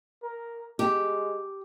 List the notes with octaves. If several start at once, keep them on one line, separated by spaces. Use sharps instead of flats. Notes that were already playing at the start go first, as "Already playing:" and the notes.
A#4
G#3 G4